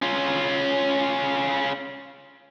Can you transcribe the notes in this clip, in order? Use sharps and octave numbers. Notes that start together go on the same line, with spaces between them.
C#4 F4